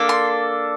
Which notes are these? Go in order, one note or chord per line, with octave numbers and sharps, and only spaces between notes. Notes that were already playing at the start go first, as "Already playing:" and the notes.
Already playing: A#3 D4 A4
C6